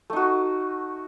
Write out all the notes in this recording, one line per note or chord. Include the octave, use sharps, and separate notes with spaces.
A3 D#4 F#4